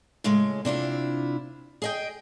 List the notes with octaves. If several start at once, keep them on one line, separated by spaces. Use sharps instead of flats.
A2 C#3 G#3
C3 D4 E4 F4
G#4 D#5 G5